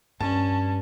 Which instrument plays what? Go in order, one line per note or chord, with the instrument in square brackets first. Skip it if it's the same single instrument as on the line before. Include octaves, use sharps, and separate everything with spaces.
[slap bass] G2 [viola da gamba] C#4 [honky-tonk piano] A5